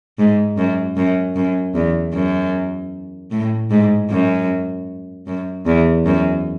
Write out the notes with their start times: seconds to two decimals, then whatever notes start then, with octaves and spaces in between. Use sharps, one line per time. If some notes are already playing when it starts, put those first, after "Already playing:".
0.19 G#2
0.58 F#2
0.97 F#2
1.36 F#2
1.75 E2
2.14 F#2
3.31 A2
3.71 G#2
4.11 F#2
5.27 F#2
5.67 E2
6.06 F#2